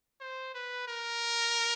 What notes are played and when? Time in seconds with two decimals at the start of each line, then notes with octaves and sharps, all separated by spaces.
0.21 C5
0.55 B4
0.88 A#4